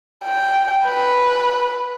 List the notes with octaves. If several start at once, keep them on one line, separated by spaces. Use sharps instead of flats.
G5
B4